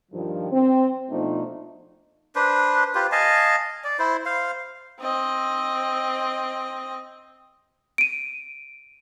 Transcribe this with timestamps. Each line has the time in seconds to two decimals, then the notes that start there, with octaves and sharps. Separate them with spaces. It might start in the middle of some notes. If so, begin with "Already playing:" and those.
0.12 G2 D#3 F3
0.52 C4
1.10 B2 F3 A3 D4 D#4
2.35 D4 B4 C5
2.95 F4 G4 B4 C5
3.12 D#5 F5 G#5 A5
3.84 D5
3.99 E4 C5
4.26 C5 F5
5.01 C4 D#5
7.98 D7 D#7